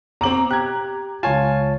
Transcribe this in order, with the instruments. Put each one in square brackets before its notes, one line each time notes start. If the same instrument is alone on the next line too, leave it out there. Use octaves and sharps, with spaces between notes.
[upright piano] B2 C4 [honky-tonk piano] A#5 D6 F#7
[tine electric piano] G4 [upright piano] F#6 G#6
[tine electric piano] C#2 C#5 A5 [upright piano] F4 G#5